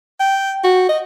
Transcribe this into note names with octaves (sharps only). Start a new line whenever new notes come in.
G5
F#4
D#5